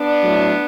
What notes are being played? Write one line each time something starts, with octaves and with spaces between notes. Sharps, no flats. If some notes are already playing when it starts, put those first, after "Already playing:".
Already playing: B3 D4
A2 F#3 A3